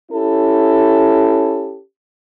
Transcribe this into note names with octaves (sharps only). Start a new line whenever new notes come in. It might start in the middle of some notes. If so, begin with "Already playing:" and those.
C#4 E4 G4 A4